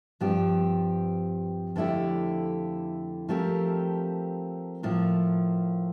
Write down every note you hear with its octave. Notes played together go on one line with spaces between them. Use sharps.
G2 F3 C4 G4
F2 D3 A3 E4 G4
F3 A3 C4 G4 A#4
A2 F3 A#3